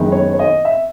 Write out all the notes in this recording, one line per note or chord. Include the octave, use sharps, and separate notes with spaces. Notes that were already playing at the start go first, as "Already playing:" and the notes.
Already playing: F#1 F#2 D#3 G#3 B3
C#5
C#5
D#5
E5